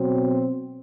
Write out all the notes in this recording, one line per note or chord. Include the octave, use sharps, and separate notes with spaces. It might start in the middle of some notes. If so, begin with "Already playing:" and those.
Already playing: B2 F#3 C4